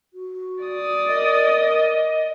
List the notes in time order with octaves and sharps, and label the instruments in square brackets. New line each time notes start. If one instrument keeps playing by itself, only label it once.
[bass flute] F#4
[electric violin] D5 D#6
[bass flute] A#4 [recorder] D#5